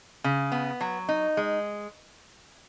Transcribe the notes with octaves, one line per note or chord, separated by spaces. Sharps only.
C#3
B3
F#3
D#4
G#3